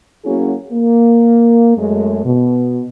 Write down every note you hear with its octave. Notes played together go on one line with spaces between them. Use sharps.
F#3 A#3 C#4 E4 F#4 G#4
A#3
F#2 G#3 A3
B2